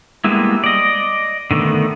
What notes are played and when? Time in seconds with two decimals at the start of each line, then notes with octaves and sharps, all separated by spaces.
0.24 G3 G#3 A#3 B3 E4
0.64 D5 D#5
1.51 D3 D#3 A3 B3